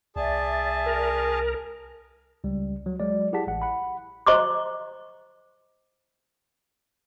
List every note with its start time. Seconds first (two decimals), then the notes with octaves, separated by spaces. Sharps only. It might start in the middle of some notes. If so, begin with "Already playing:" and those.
0.16 C2 G#4 D5 E5 A5
0.86 A#4
2.44 C#2 G3
2.86 F#3
3.00 F#3 G#3 D5
3.33 E4 G4 G#4 F#5 A5 B6
3.47 A1 F#5
3.62 F#5 B5
4.27 C5 D#5 A#5 C#6 D6